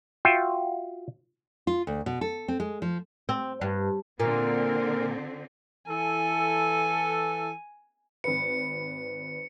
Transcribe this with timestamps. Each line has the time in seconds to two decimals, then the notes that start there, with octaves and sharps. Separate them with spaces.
0.25 F4 F#4 E5 G5
1.67 F4
1.87 D2
2.06 B2
2.21 A4
2.48 C4
2.60 G#3
2.82 F3
3.29 C4
3.61 G2
4.20 A#2 D3 C4 A#4
5.89 E3 A4 G#5
8.24 G#1 B4 C#7